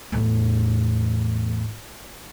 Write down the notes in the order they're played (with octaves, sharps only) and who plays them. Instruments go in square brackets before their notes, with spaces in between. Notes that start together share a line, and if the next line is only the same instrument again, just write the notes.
[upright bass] E2 A2